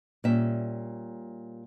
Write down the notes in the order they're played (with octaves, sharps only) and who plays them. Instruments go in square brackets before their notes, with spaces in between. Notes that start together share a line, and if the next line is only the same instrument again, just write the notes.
[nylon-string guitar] A#2 G3 C#4 E5